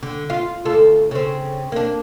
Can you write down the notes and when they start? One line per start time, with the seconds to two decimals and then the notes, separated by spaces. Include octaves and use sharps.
0.03 D3
0.30 F4
0.65 D2 F4 A4
1.11 C#3 C4
1.72 A#3 D4